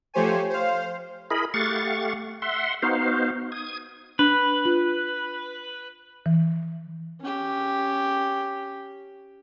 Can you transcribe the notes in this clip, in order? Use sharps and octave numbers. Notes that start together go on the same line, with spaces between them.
F3 A3 G4 C5 C#5 G#5
C5 F5
E4 G#4 A#4 D#5 B5
A3 G4 F5 F#5 C#6 A6
E5 F#5 C6
B3 D#4 F#4 C5 F5
D#6 G#6
D4 B4
F4
E3
C#4 G4